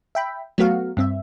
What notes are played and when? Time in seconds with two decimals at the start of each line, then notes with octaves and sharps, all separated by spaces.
0.15 E5 G5 B5
0.58 F#3 A3 B3 F#4 F5
0.97 G2 C4 E5